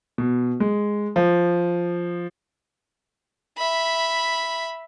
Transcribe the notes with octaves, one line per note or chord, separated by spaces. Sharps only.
B2
G#3
F3
E5 B5